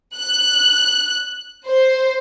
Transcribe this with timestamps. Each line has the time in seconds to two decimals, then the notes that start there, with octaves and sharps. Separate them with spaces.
0.15 F#6
1.67 C5